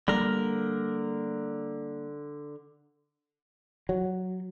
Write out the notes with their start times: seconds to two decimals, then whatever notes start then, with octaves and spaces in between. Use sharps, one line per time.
0.08 D3 G3 A#3 A#4
3.89 F#3